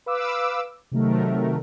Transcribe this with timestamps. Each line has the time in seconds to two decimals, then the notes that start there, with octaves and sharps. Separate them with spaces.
0.06 B4 F5 D6 E6
0.91 C3 D#3 F#3 A3 A#4